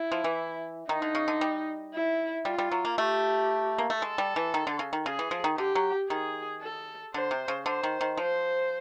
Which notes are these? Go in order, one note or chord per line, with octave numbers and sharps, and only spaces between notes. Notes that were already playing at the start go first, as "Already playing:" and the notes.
Already playing: E4
F3
E3
D#3 D#4
D3
C#3
D3
G3
E4
G3 F4
G3
F#3
A#3
A3 G4
A#3
A3
G#3 A4
G3
E3
D#3
D3
C#3
D#3
C#3 G#4
E3
F3
D#3
D3 G4
F#3
D#3 G#4
A4
D3 C5
C3
C#3
D3 C5
D#3
D#3
F3 C5